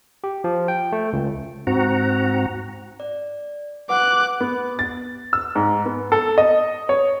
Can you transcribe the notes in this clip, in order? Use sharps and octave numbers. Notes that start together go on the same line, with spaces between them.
G4
F3
G5
A3
C#2
G#2 C4 F#4 F#5 A#5
D5
B4 F#5 D6 F#6
B3
A6
E6
G#2
B3
A4
D#5
C#5